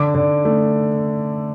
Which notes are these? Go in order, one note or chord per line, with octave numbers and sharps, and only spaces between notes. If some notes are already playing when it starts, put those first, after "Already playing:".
Already playing: D3 D6
D3
A3